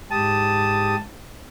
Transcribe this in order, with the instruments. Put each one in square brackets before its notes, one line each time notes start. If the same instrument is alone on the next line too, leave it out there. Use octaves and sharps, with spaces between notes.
[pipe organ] G#2 G4 D#6 [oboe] A5